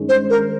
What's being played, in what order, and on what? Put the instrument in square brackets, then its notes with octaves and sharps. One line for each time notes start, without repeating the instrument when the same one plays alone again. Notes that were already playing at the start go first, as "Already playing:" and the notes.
Already playing: [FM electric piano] G2 D#3 G#3 C#4
[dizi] C5
A#4